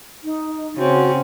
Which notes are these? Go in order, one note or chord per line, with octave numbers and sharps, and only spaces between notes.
D#4
C#3 C4 C#4 F#4